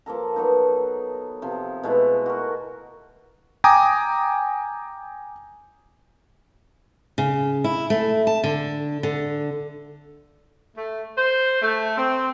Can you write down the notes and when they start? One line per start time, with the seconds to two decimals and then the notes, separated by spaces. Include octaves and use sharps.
0.06 F3 A#3 A4 A#5
0.36 F#3 B3 D#4
1.42 C3 F3
1.83 B2 G#3 A3 E4
2.26 F#4 A#4
3.64 G5 G#5 A#5 D6 D#6
7.18 C#3
7.64 E4
7.90 A3
8.27 A5
8.44 D3
9.03 D3
10.76 A3
11.17 C5
11.62 A3
11.97 C4